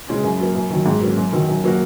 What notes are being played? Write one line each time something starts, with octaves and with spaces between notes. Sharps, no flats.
C#3 G#3 C#4 G#4
F#2
F#3 A#3
F#2
D#3 F#3
G#2
F#3 A#3 C#4
F#2
D#3 F#3
F#2
F#3 A#3 F#4